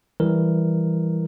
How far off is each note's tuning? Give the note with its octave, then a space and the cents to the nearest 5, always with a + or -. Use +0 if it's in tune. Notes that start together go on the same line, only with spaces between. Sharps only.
E3 +0 G3 +0 A#4 +0